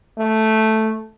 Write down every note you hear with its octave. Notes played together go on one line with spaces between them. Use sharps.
A3